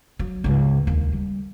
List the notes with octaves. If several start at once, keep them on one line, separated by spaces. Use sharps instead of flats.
F#3
C#2 G#2
D#2
G3